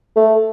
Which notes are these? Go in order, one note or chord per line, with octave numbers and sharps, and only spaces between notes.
A3